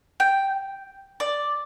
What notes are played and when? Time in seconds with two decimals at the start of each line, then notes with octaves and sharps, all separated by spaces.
0.20 G5
1.20 D5